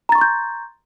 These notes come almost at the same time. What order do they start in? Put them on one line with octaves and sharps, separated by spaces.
A#5 A6 C#6 C6 G6